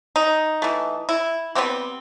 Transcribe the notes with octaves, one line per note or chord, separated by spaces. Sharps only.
D#4
E3 A3
E4
E3 G3 B3 C4